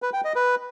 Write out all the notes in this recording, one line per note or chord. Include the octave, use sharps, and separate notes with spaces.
B4
G5
D#5
B4